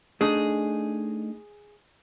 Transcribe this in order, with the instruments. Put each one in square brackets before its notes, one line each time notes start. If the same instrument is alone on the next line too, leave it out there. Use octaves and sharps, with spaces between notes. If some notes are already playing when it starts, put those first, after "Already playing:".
[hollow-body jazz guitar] A3 D4 D#4 [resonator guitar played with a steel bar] G#4